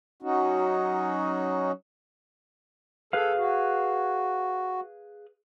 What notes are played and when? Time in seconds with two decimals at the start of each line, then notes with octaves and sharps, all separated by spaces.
0.22 F#3 C#4 D#4 F#4
3.13 G#4 A4 B4 F5
3.37 F#4